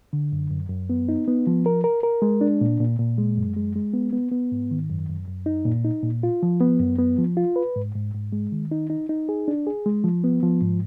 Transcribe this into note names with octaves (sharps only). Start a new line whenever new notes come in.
D3
F#2
F#2
F#2
B3
D#4
B3
F3
A#4
A#4
A#4
G#3
D4
A#2
A#2
A#2
G#3
F#2
G#3
G#3
B3
B3
B3
G#2
D#3
F#2
F#2
F#2
D#4
A#2
D#4
A#2
F4
F3
B3
F#2
B3
F3
F4
B4
G#2
G#2
G#2
G#3
D#3
D#4
D#4
D#4
G#4
D4
G#4
G#3
F3
B3
F3
G#2